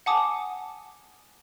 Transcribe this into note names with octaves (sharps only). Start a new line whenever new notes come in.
F#5 G#5 A5 D6 D#6